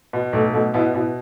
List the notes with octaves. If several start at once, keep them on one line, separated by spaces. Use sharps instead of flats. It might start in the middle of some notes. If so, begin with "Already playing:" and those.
B2
B1 A3
B2 A3
B2 B3 E4
B2 B3 E4